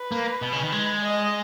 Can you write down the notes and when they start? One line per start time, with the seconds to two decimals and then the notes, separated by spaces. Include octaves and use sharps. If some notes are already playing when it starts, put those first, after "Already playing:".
Already playing: B4
0.12 A#3
0.42 B2
0.52 C#3
0.62 D#3
0.72 G#3
1.03 D#5